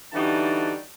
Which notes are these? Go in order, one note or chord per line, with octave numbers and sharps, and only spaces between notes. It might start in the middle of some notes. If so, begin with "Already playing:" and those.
D3 E3 G3 D#4 F#4 A5